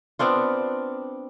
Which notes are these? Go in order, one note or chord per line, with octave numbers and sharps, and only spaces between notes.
B3 C4 D4 F4